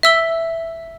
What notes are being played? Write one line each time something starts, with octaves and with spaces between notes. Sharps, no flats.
E5 E6 G7